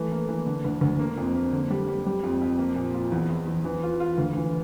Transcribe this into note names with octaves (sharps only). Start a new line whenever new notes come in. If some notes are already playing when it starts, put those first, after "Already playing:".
Already playing: E3 A3
A#3
E3
D3
D2
D2
A#3
F2
A#3
D3
G3
G3
G3
F2
F2
A#3
A#2
F4
E2
E2
E2
E3
F4
F4
D2
E3